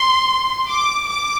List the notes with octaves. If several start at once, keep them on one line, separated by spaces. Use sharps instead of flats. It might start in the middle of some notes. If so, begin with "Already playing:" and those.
Already playing: C6
D6
D6